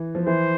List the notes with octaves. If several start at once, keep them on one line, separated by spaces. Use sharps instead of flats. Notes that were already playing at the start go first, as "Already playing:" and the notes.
Already playing: E3
F3
E3 C5